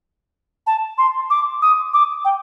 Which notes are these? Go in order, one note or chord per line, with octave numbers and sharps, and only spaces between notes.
A5
C6
D6
D#6
D6
G5